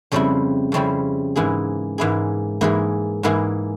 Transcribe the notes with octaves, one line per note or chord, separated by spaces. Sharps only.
F2 C#3 G3 C4 E4
F2 C#3 G3 C4 E4
G#2 E3 A#3 E4 G#4
G#2 E3 A#3 E4 G#4
G#2 E3 A#3 E4 G#4
G#2 E3 A#3 E4 G#4